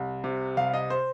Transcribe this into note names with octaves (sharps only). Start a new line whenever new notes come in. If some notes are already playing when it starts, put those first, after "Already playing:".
Already playing: C2
C3
C2 F5
D#5
C5